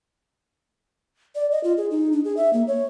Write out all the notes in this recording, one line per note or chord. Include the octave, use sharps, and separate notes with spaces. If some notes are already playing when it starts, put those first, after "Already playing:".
D5
D#5
F4
G#4
D#4
D4
G#4
E5
A#3
C#5